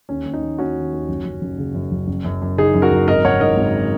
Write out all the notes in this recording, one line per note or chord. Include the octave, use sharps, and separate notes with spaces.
D#2 C#4
D#2
D#4
D#2
D#2 C#4 F#4
D#3
D#2
F#1
F#1
F#1
C#3
F#2
F#1
F#1
F#2
F#2
C#3 D#4 G#4
F#2
F#4 A#4
F#1
G#1 A#4 D#5
G#1 C#5 F#5
G#2 A#4 D#5
G#1